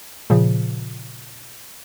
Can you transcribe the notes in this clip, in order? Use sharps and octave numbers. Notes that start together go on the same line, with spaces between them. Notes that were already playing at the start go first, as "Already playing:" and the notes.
A#2 C#3 F3